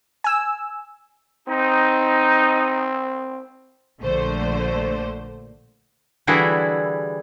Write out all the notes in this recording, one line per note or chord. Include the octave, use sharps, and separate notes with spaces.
G#5 E6
C4 D#4
A#1 D3 A3 C5
D3 E3 G3 E4 F#4 G#4